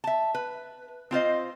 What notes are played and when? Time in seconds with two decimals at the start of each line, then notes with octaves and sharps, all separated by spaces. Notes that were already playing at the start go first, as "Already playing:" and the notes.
0.04 E5 A5
0.35 B4
1.11 C4 F4 C5 D#5